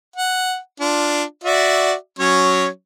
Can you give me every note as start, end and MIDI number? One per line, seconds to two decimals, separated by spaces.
0.16 0.57 78
0.80 1.23 62
0.80 1.23 65
1.44 1.94 66
1.44 1.94 74
1.44 1.94 76
2.19 2.67 54
2.19 2.67 61
2.19 2.67 73